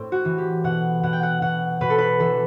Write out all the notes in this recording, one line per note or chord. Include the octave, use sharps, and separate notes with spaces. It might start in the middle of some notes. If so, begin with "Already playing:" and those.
Already playing: A2 C4
F#4
E3
G4
B2 F#5
B2 F#5
G5
F#5
B2 F#5
B2 B4
A4
B4
E3 A4